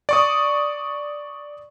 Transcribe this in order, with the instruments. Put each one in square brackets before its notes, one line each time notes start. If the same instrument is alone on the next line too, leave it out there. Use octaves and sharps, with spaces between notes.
[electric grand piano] D5 C#6 D#6